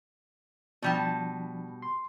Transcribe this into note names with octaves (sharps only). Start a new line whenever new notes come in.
B2 F3 G3 D4 A5
C6